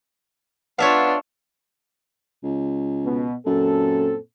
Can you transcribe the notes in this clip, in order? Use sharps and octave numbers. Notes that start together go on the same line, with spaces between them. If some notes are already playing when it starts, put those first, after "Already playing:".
B3 D4 F4 C#5 E5 F5
C#2
B2
F#2 A#2 C4 A4